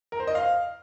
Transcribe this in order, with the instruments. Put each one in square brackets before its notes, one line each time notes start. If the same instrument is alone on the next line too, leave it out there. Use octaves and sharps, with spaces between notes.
[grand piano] A#4
C5
D#5
F5